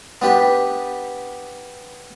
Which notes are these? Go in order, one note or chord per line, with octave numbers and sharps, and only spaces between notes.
B3 D4 G4 B4